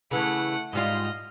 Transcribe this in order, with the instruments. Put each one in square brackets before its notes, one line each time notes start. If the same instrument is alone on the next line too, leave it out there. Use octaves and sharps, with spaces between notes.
[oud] C#3 E3 [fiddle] A3 F#5
[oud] G#2 G3 F4 [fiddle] D#5 F6